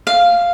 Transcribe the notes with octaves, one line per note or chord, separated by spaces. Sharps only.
F5